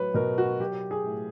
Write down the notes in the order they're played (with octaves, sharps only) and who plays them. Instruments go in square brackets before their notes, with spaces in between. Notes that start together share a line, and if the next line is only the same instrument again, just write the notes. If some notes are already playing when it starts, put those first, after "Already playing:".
Already playing: [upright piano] A2 F#3 B4 C#5
B2 A#4
F#4
F#3 G4
G#4
A2